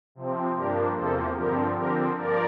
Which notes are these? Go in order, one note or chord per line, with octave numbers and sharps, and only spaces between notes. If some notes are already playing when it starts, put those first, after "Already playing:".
C3 F3 C4
G2 F3 A#3 D4 G4 A#4
E2 C3 F3 A#3 A4 C5
G2 D3 F3 C4 G4 A#4
D3 F3 C4 G4 A#4
G2 F3 A#3 A#4 D5